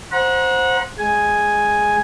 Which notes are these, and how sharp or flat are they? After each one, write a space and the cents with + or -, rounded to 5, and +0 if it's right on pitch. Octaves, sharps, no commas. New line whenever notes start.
C5 +5 F#5 -20 A#5 +35
G#3 +0 G#5 +0